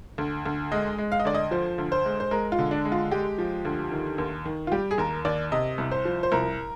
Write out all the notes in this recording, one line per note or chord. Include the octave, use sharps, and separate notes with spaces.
D2
D2
G#3 D#5
G#3
F5
D#5
D2 D5
D#5
F3 C5
D2
C5
G#3
C5
G#3 A#4
F4
D3
D4
G#3
F4
G#3 G4
F3
D2
D#3
D#2
D#3
F4
G3 G4
G#4
D#2 A#4
D#2 D5
C3 D#5
C2
C5
F3
C5
C2 A#4